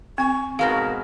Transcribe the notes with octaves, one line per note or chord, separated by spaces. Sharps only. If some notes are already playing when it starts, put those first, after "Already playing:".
C4 G#5 C#6
G#2 B2 G#3 A#4 F5